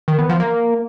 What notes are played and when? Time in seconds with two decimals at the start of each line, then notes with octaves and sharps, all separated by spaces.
0.08 D#3
0.19 B3
0.29 F3
0.40 A#3